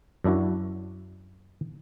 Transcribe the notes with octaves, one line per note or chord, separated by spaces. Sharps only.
F#2 D4 E4 F#4